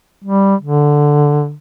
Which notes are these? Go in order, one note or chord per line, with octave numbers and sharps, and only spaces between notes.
G3
D3